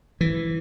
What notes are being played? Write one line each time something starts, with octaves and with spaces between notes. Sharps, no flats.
E3